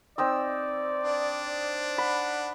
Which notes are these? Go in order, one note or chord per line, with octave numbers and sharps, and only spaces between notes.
C4 D#4 D5 E6
D4
F#5 B5